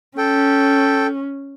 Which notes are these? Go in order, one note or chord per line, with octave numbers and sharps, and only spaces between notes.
C#4 A4 G5